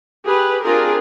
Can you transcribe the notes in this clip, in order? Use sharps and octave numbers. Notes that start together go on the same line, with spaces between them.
G4 G#4 B4
C4 D4 F4 G4 G#4 A#4